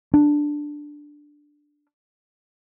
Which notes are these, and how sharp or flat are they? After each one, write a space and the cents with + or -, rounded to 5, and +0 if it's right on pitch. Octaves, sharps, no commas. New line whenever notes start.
D4 +5